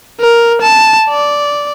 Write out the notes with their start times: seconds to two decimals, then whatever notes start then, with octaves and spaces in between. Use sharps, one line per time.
0.20 A#4
0.62 A5
1.10 D5